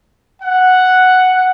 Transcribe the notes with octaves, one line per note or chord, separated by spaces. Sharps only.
F#5